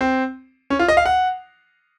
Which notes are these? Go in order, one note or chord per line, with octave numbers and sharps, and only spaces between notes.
C4
C#4
F4
D#5
F5
F#5